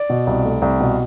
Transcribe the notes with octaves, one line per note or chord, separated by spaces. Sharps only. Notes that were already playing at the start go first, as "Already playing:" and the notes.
Already playing: D5
B2
C2
A3
C2
B2